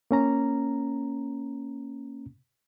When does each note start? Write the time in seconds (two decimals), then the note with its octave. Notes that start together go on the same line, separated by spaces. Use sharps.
0.11 A#3 C#4 A#5